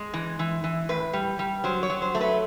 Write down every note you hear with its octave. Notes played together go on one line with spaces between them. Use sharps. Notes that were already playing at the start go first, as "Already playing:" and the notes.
Already playing: G#3
E3
E3
E3
A2 B4
G3
G3
F#3 C5
C#5
F#3
C5
A3
B4